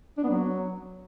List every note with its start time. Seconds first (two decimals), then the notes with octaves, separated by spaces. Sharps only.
0.18 D4
0.23 B3
0.29 F#3